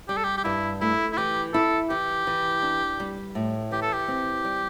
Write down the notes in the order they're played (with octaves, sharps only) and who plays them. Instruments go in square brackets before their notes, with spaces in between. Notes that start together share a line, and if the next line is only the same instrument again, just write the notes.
[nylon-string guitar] G3 [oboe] G4
[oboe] A4
G4
G4
[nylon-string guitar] G2 [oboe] E4
[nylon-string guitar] A3 [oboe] E4
[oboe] E4
[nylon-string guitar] E3 [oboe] G4
[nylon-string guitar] E4 [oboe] A4
[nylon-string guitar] E3 [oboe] G4
[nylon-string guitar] E3
D4
G3
A2
[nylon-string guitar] E3 [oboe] G4
[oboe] A4
G4
[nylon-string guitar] C4
G3